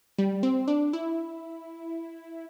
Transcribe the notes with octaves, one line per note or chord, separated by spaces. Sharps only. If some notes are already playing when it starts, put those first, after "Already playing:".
G3
C4
D4
E4